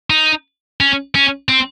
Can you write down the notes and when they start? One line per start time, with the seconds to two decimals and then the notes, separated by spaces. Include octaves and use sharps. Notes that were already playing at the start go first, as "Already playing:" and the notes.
0.10 D#4
0.80 C#4
1.15 C#4
1.49 C4